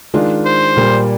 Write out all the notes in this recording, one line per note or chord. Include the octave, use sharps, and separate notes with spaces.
D#3 G#3 D4 F4
C5
A#2 G3 A#3